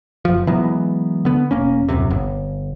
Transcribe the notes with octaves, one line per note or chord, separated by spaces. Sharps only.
F#1 F3
E3 F#3 G#3 B3
D3 B3
E1 A#3 C#4
D#1 G#1 F#2 C3
G1